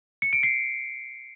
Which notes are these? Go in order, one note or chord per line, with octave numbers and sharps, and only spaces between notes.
C#7
D7
C7